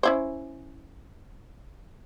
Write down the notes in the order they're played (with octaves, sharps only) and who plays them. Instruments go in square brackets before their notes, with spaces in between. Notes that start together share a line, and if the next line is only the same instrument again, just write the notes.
[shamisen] C#4 E4 C5